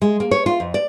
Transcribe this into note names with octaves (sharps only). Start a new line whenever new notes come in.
G#3
A#3
C#5
F4
F2
D5